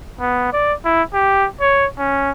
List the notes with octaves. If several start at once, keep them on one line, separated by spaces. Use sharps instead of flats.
B3
D5
E4
G4
C#5
C#4